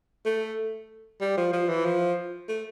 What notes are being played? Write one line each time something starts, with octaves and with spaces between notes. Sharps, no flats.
A3
G3
F3
F3
E3
F3
A3